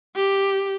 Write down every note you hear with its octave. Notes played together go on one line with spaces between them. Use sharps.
G4